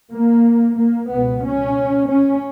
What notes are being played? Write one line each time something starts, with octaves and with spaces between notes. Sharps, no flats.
A#3
A#3
C#2 B2 B3
C#4
C#4